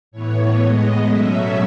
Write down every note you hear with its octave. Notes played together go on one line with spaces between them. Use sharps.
A2 E3 B3 C#5
A2 G#3 B3 D#5
B2 F#3 A3 C#4 E5